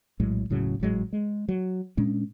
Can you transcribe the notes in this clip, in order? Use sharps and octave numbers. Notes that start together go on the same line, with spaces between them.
A#1 A2 F#3 G#3
E1 A2 C#3 F#3
G#1 A2 F#3 G#3
G#3
F#3
A#2 G#3 C#4 D4